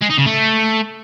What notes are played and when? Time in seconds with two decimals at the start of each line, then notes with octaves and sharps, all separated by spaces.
0.01 G#3
0.10 D#4
0.18 C#3
0.26 A3